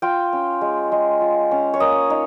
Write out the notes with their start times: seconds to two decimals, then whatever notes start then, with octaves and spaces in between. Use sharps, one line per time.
0.02 F4 G5
0.33 C#4
0.61 G#3
0.92 G#3
1.21 F4
1.51 C#4
1.74 C#5
1.80 A#3 D#5
2.10 D#4